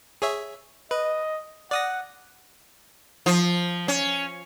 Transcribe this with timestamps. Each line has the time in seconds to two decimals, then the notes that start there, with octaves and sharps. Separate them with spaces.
0.22 G#4 C#5 E5
0.91 B4 D#5
1.71 D5 F#5 D#6 A#6
3.26 F3
3.88 C#4